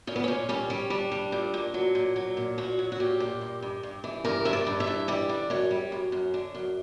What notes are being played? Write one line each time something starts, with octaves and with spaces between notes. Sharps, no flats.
A#2 C#4
B3
A#2 C#4
G3 C#4
G3
G3 D4
G3
A#2
A#2
F#3
A#2
F#3
A#2
A#2 F#4
F#3
F#4
A#2 G4
A#2
G2
G2
G2
E3
G2 A#4
G2 E5
D5
G2
E5
E3
G3 D5
D3
F#2 C#5
G3
F#2
F#2
D3
F#2